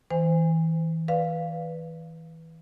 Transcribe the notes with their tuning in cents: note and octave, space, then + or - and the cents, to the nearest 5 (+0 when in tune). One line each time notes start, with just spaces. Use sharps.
E3 -30 C5 -25 G#5 -25
B4 +0 D5 -5 F5 +0